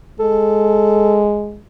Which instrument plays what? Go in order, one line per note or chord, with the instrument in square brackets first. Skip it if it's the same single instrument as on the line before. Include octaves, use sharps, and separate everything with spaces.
[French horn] G#3 [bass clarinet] A4